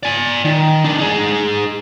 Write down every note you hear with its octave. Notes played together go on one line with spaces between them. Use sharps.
D5 G#5
D#3
D#3 D4
D#4 G#4